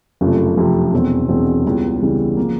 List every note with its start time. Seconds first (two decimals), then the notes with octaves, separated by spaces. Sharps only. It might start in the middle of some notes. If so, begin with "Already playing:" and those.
0.21 F#1 F2 C3 F3 A3
0.56 F#1 F2 C3 F3 A3
0.93 E1 E2 B2 G#3 C4
1.29 E1 E2 B2 G#3 C4
1.64 C#2 C#3 E3 G3 B3
2.02 C#2 C#3 E3 G3 B3
2.37 C#3 F3 A#3